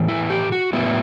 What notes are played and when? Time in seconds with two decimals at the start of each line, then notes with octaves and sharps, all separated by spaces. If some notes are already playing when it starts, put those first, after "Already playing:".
Already playing: A2 E3 B3
0.08 E4
0.30 G4
0.52 F#4
0.73 A2 F#3 B3 E4